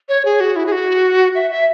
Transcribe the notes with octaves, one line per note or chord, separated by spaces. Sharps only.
C#5
G#4
F#4
E4
G#4
F#4
E5
E5